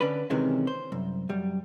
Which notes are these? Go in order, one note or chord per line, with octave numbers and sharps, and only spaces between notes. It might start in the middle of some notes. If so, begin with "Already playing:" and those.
D3 C#4 D4 B4
C3 D#3 E3 G#3 C#4
C5
C2 F#2
F#2 G3